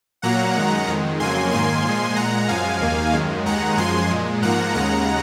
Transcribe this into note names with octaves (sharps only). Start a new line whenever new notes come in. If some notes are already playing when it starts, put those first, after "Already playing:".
A#2 F#3 A#3 F#5 A#5
F#2 D#3 G#3
F2 D#3 G#3
F2 C#3 F#3 A#3 G#5 C6
G#2 D#3 A#3 G#5 C6
A#2 F3 G#3
A#2 G#3 F#5 A#5
F#2 F3 G#3 F5 G#5
D#2 D#3 A#3
F#2 D#3 G#3
D#2 D#3 G#3 F#5 A#5
F#2 F3 G#3 G#5 C6
A#2 G#3
G#2 F3 A#3 F#5 A#5
D#2 C#3 G#3 F#5 A#5